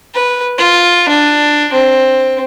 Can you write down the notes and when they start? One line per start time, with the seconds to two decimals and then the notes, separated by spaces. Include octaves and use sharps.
0.14 B4
0.58 F4
1.08 D4
1.73 C4